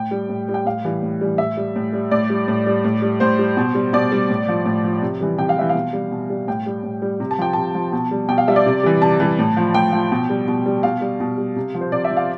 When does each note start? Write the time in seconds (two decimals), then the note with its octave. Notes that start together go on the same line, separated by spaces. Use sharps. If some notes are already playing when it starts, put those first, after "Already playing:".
Already playing: A2 G5
0.11 G3
0.29 A2
0.49 G3
0.54 G5
0.65 A2 F5
0.85 E3 G3
1.03 A2
1.21 E3 G3
1.38 A2 E5
1.57 G3
1.76 A2
1.93 G3
2.11 A2 D5
2.30 G3
2.48 A2
2.66 G3
2.84 A2
3.02 G3
3.20 A2 C5
3.39 G3
3.57 B2
3.75 G3
3.93 B2 D5
4.12 G3
4.30 A2
4.48 F3
4.66 A2
4.84 F3
5.02 C3
5.21 E3 G3
5.38 C3 G5
5.49 F5
5.57 E3 G3 E5
5.69 F5
5.75 B2
5.93 G3
6.11 B2
6.30 G3
6.48 A2 G5
6.66 G3
6.83 A2
7.02 G3
7.20 C3
7.31 A5
7.39 F3 G5
7.53 C3 A5
7.75 F3
7.92 B2
8.11 G3
8.29 B2 G5
8.38 F5
8.48 G3 E5
8.56 D5
8.66 C3
8.83 E3 G3
9.01 C3 A5
9.20 E3 G3
9.39 A2
9.57 F3
9.74 A2 G5
9.92 F3
10.12 B2
10.30 G3
10.48 B2
10.66 G3
10.83 B2 F5
11.01 G3
11.20 B2
11.38 G3
11.56 C3
11.74 F3
11.81 C5
11.92 C3 D5
12.04 E5
12.10 F3
12.17 F5